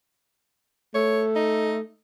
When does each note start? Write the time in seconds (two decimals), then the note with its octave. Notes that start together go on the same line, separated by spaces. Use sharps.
0.95 A3 C#5
1.35 D#4